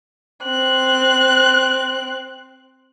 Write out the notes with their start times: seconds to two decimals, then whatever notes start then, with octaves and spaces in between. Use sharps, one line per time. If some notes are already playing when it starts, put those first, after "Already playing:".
0.46 C4 F#6